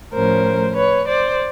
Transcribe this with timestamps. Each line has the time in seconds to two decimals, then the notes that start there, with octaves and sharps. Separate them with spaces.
0.13 A2 F3 A3 C#4 A#4 C5
0.75 B4 C#5
1.06 C5 D5